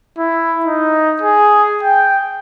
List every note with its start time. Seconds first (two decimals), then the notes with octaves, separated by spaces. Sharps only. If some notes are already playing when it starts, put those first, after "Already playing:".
0.18 E4
0.66 D#4
1.21 G#4
1.83 G5